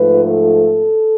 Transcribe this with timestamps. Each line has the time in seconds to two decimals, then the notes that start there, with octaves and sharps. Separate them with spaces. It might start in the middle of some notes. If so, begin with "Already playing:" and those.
Already playing: G#2 F3 A3 B4
0.25 A4